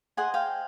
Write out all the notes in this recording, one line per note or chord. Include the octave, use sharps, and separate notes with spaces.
G#4 C5 D#5 F#5 G#5
F5 G5